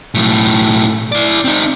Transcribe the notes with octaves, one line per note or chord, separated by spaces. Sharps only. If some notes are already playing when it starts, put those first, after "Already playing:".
B1 A2
E4 D5
C4 D#4